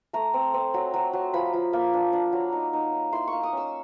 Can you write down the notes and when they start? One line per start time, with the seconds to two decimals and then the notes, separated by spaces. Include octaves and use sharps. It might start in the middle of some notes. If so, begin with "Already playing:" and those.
0.13 A3 A#5
0.34 C4
0.54 C4
0.74 F#3
0.94 F#3
1.13 F#3
1.34 F3 B5
1.53 F3
1.73 A#3
1.93 D4
2.13 D4
2.33 F#3
2.53 D#4
2.73 D#4
2.93 D#4
3.12 E4 C6
3.28 A#3 C#6
3.43 D#6
3.53 C#4 E6